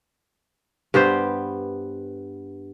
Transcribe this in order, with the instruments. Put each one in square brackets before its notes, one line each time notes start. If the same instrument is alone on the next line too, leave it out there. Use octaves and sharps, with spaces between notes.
[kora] G2 B3 G4 C5